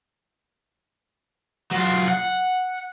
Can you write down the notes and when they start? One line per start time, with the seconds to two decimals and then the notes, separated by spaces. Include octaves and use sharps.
1.71 F#3 F4
2.08 F#5